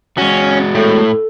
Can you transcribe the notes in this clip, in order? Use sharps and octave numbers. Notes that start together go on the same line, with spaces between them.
G#3 C#4 F#4
A2 A4